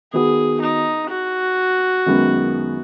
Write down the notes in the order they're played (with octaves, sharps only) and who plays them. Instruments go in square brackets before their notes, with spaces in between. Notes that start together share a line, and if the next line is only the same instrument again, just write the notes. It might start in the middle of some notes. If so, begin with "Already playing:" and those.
[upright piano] D#3 B3 F#4 B4 [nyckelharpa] G#4
[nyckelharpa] D#4
F#4
[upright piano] F#2 D#3 G#3 B3